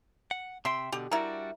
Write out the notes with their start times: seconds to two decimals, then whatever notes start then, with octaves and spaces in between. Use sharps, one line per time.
0.31 F#5
0.65 C3 E5 G5 C6
0.92 B2 D3 G4
1.11 G3 D4 E4 F#4 A#4